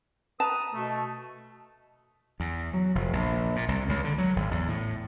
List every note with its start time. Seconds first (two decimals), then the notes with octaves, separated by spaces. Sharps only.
0.40 B4 A5 A#5 D#6
0.74 B2 A3
2.40 E2
2.74 F#3
2.95 F1
3.13 A#1
3.56 A#2
3.68 C2
3.89 C#2
4.04 D3
4.18 F#3
4.36 G#1
4.51 E2
4.69 A2